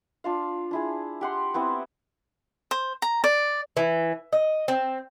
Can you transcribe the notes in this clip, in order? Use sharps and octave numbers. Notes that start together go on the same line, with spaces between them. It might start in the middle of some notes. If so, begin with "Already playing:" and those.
D4 F4 F5
D4 E4 G#4
G4 F#5 C6
B3 C4 E4 C5
C5
A#5
D5
E3
D#5
C4